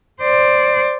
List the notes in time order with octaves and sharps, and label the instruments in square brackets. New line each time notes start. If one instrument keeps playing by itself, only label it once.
[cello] C5 D5